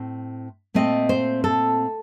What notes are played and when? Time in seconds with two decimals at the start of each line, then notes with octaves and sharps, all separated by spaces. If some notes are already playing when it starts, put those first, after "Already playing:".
Already playing: A2 C4
0.74 A#2 A3 C4 D#5
1.09 C5
1.44 A4